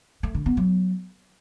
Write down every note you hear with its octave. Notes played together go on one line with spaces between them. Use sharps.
A3
D3
B3
F#3